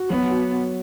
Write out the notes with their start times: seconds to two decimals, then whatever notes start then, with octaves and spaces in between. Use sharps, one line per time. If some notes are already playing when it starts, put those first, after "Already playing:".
Already playing: F#4
0.10 F#3 B3
0.31 F#4